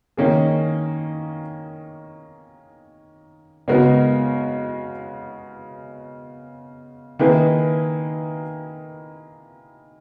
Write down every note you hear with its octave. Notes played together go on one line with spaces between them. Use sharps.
D#3 A#3 C#4 G#4
C#3 G#3 B3 F#4 A#4
D#3 A#3 E4 G#4 B4